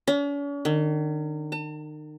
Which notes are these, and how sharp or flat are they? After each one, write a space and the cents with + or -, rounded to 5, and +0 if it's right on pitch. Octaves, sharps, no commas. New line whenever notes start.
C#4 +45
D#3 -35
A5 +40